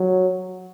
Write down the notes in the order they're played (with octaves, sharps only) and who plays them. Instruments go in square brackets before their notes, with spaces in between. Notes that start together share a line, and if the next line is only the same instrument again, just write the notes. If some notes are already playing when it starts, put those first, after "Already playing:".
Already playing: [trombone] F#3